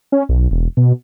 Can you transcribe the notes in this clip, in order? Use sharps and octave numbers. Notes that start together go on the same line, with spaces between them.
C#4
B1
E1
B2